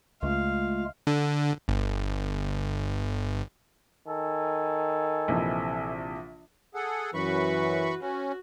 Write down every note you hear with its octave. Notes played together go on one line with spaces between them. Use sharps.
C#2 G#3 A3 F4 F5
D3
G1
D#3 A4 G#5
A#1 C3 E3
G#4 A4 F#5
F#2 E3 F#4 B4 B5 C#6
C#4 F#4